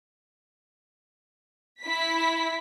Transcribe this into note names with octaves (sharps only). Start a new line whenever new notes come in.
E4 B6